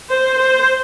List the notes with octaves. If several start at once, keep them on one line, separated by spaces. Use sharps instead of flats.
C5
C5